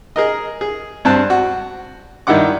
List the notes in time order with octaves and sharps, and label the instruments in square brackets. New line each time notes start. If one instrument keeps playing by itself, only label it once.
[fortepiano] G#4 A#4 D#5
G#4
G2 C4 A5 F#6
F#4
G2 D#3 D#4 E4 F#5 D6